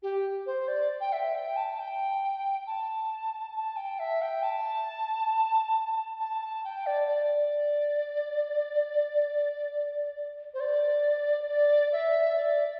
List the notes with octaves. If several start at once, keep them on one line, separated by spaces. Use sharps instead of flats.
G4
C5
D5
G5
E5
G5
A5
G5
A5
A5
G5
E5
G5
A5
A5
A5
G5
D5
D5
C5
D5
D5
E5
D5